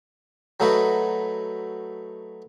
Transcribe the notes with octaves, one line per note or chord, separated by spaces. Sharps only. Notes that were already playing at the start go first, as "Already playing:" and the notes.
F#3 A3 D#4 F#4 B4